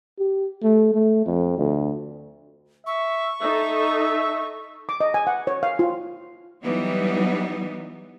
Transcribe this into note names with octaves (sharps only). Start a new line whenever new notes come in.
G4
A3
A3
F2
D2
E5 C#6
D#4 A4 E5
D6
D#5
G#5
F#5
C#5
F5
F4
E3 F#3 G3 B3 D#4